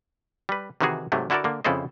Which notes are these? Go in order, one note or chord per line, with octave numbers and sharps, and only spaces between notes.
G3 B4
C3 D#3 E3 D#4 F#4 G#4
G#2 C3 F#3 A3
D3 E4 F#4 A4 A#4 D5
D3 A#3
F2 C#3 E4 A4 C5 D#5